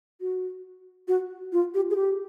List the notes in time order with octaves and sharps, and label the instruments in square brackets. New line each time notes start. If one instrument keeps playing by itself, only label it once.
[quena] F#4
F#4
F4
G4
G#4
G4